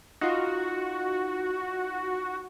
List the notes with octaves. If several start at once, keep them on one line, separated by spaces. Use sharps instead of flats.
D#4 F4 F#4